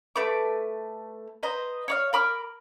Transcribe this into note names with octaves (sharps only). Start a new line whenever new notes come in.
A3 B4 D6
B4 C5 D#5 A#5
C#5 D5 F5
A#4 B5 D6 F6